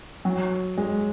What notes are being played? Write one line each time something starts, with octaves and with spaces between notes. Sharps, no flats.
F#3
G#3